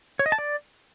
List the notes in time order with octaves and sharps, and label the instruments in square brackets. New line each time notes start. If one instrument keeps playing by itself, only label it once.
[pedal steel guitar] C#5
D#5
A5
D5